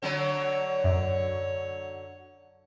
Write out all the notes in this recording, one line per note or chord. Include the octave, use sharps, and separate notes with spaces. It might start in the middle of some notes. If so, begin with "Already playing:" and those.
D3 F#3 C#5
F#2